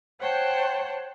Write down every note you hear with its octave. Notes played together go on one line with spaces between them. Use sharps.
C5 C#5 F#5 G5 A5